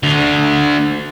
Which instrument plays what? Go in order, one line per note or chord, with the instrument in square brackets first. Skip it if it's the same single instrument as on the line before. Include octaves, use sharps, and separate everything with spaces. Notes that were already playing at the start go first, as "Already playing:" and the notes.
[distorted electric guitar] D2 D3